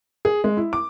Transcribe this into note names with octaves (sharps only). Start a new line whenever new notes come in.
G#4
G#3
E4
D6